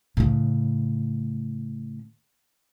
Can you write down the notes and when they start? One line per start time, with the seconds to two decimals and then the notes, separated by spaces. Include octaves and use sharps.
0.17 A2 C#3